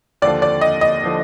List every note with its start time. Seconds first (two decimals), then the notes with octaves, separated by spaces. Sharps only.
0.22 D#2 D3 F3 D5
0.42 D5
0.61 D#5
0.81 D#5
1.04 D3 F3